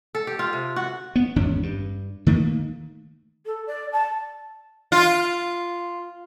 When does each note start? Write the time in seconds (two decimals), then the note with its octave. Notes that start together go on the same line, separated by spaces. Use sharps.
0.15 A4
0.27 G4
0.39 F4
0.53 C3
0.76 F#4
1.16 B3
1.36 G#1 E2 C#4 D4
1.63 G2
2.26 D#3 A3 A#3
3.46 A4
3.67 D5
3.92 A5
4.92 F4